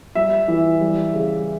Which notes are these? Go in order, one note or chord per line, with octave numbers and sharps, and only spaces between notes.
G3 E5
E3
G3
C#3